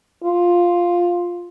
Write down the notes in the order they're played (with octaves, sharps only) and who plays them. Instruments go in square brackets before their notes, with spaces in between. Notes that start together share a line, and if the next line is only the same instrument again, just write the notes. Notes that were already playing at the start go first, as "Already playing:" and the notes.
[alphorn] F4